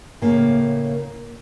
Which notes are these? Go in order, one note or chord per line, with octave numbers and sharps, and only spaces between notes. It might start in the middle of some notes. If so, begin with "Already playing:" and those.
A2 C#3 A#3